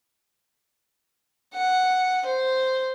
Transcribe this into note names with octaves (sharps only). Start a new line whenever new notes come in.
F#5
C5